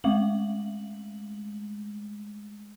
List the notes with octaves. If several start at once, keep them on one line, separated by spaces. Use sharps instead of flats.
G#3 A3 F#7